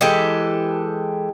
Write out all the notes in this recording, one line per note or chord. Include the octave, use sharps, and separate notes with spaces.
E3 G#3 G4 A4